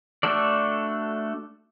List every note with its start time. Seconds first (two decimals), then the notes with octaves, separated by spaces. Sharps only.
0.23 A3 D4 F#4 A4 D5